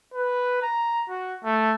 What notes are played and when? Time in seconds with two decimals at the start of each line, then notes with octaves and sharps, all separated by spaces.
0.14 B4
0.62 A#5
1.09 F#4
1.44 A3